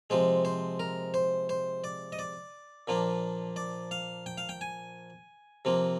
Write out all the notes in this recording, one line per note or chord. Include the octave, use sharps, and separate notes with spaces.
C3 F3 G#3 C5
C5
A#4
C5
C5
D5
D#5
D5
A#2 F3 A#3 D4
D5
F5
G5
F5
G5
G#5
C3 F3 A#3